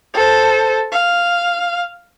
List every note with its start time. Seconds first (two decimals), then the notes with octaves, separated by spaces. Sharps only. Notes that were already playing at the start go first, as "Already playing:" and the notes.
0.14 A4 C5
0.92 F5